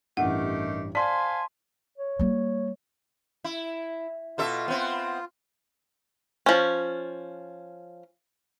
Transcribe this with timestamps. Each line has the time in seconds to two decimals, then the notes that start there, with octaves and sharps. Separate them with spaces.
0.17 A1 G2 D#3 A3 G4 F#5
0.95 C5 D5 F5 G#5 A5 C6 B6
1.98 C#5
2.19 G3 A#3
3.44 E4
4.38 B2 F4 A4 E5
4.68 B3 C4
6.46 F3 C#4